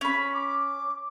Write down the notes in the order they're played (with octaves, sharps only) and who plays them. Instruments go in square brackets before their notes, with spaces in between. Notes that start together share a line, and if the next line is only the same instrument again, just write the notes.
[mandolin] C#4 B5
[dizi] D6